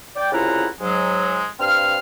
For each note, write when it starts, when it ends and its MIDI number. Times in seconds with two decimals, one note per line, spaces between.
0.16 0.29 74
0.16 0.29 79
0.32 0.66 36
0.32 0.66 49
0.32 0.66 64
0.32 0.66 65
0.32 0.66 78
0.32 0.66 82
0.80 1.44 44
0.80 1.44 54
0.80 1.44 56
1.59 1.99 43
1.59 1.99 60
1.59 1.99 77
1.59 1.99 89